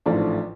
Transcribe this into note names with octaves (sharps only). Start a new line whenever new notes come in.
A1 G#2 F3 A3 D4